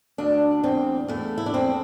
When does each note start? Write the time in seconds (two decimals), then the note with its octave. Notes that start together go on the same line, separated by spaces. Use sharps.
0.18 D2 D4
0.63 E2 C4
1.08 E2 A3
1.38 E4
1.46 D4
1.54 E2 C4